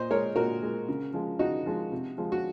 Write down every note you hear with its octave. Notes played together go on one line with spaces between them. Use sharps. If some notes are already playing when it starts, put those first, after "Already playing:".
Already playing: A#2 C5 D#5
G#3 A#4 C#5
A#2 F#4 A#4
G#3
C#3
F3 G#3
C#3 D#4 F#4
F3 G#3
C3
F3 G#3
F#4